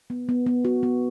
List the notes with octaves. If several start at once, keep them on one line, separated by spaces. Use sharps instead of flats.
B3
B3
B3
F#4
B3